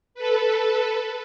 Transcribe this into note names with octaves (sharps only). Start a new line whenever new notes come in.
A4 B4